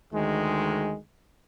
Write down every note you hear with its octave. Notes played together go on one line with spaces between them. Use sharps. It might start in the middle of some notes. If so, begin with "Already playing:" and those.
D2 D#3 G#3